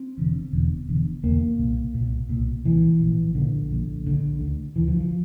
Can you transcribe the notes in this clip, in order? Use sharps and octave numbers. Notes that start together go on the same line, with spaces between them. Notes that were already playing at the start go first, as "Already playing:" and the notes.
Already playing: C4
E1 E2 D3
E1 E2 D3
E1 E2 D3
E1 E2 D3 A#3
C2 A#2
C2 A#2
C2 A#2
C2 A#2 E3
A#1 A#2
A#1 A#2 D3
A#1 A#2
A#1 A#2 D3
D2 D3
D2 D3 E3
F3
F3